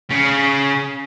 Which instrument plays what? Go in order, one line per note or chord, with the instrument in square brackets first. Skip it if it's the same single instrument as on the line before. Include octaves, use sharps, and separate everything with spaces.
[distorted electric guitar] C#3